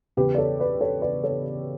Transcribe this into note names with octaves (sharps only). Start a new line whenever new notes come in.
E2 C#3 E3 G4 B4
D5
A4 C#5
B4 D5
A4 C#5
B4 D5
A4 C#5